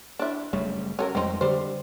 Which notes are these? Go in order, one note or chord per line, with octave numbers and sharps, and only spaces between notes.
D4 E4
F#1 C#3 G3 A3
C#4 A4 A#4
F2 G3 G#3 C4 D#4
D3 G3 C5